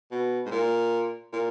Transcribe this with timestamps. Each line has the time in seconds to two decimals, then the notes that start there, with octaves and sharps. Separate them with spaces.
0.11 B2
0.46 G#2
0.51 A#2
1.33 A#2